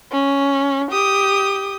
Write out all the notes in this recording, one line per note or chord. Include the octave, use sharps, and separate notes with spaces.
C#4
G4 D#6